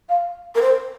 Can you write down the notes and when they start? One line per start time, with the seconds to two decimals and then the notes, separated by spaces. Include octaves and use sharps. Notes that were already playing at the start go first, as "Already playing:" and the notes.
0.09 F5
0.55 A#4
0.61 C5